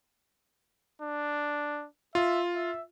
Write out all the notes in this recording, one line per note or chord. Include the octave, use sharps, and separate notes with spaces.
D4
F4 E5
E5